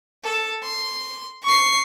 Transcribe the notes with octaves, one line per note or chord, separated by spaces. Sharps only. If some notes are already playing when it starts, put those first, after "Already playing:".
A4
C6
C#6 C7